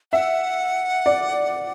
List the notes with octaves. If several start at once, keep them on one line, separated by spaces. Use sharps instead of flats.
E5 F#5
D5